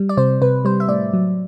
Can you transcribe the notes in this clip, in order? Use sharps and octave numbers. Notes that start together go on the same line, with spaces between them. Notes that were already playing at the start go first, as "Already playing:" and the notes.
Already playing: G3
D5
C3 C5
C3 B4
G3 C5
E5
A2 D5
F#3